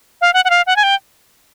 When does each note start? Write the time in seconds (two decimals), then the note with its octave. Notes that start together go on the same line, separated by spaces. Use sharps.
0.21 F5
0.34 F#5
0.45 F#5
0.50 F5
0.67 F#5
0.76 G#5
0.83 G5